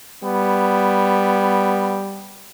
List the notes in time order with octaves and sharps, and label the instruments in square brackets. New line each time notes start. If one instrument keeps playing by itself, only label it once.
[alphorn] G3 [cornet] B3